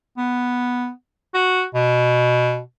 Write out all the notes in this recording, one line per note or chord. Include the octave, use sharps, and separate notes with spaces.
B3
F#4
B2